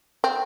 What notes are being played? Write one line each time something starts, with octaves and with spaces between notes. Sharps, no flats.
C4